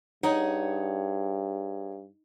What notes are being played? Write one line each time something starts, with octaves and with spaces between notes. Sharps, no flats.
G2 D#4 G#4 C#5 F#5